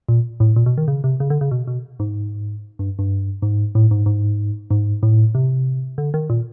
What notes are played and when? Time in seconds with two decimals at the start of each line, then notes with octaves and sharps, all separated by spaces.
0.09 A#2
0.40 A2
0.56 A#2
0.66 B2
0.78 D#3
0.88 C#3
1.04 C3
1.20 C#3
1.30 D3
1.41 C#3
1.51 B2
1.67 B2
2.00 G#2
2.79 G2
2.99 G2
3.42 G#2
3.75 A2
3.91 G#2
4.06 G#2
4.71 G#2
5.03 A2
5.35 C3
5.98 D3
6.14 D#3
6.30 A#2